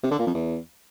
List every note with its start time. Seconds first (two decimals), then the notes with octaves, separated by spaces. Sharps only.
0.03 C3
0.11 D3
0.19 A#2
0.27 F2
0.34 E2